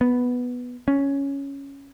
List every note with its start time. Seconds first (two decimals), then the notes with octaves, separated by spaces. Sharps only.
0.01 B3
0.88 C#4